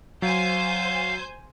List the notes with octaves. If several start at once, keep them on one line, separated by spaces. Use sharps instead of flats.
F#3 C5 F5 G#5 G6